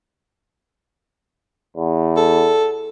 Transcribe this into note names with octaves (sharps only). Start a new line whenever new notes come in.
E2
A4